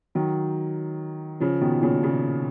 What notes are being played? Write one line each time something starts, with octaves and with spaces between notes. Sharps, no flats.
D#3 F#3
C#3 F3
B2 D#3
A#2 C#3
A#2 C#3